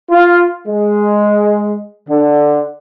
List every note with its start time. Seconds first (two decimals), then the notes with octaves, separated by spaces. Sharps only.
0.10 F4
0.67 G#3
2.08 D3